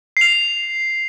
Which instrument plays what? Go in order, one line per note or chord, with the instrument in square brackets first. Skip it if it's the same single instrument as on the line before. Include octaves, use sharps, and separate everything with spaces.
[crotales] C7 F7